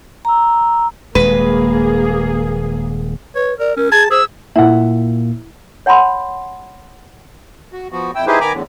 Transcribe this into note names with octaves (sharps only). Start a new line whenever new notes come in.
A#5 E6
D#1 G#3 A#3 G#4 B4
B4 C#5
A#4 D5
C#4 A#4
G#4 A5 G#6
G#4 C5 E6
A#2 A#3 E4 E5 F#5
C#5 F#5 A5 B5 C6
F#4
F3 B3 F#4
F2 E4 G5 E6
D#4 E4 G4 G#4 B4 C5
D#3 B3 G#5 A#5 B5 D6
E2 A2 D3